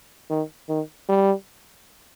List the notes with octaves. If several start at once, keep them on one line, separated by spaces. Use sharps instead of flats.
D#3
D#3
G3